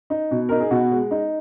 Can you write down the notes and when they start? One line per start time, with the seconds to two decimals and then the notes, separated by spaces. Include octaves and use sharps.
0.10 D#4
0.31 B2
0.49 D#4 A#4
0.60 G#4
0.71 B2 F#4
0.91 G#3
1.11 D#4